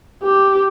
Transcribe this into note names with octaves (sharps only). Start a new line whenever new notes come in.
G4